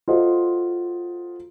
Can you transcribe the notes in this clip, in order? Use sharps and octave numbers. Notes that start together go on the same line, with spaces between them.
F4 F#4 A4 C5 D#5